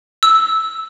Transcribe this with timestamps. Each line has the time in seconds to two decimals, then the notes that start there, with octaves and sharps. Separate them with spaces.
0.23 E6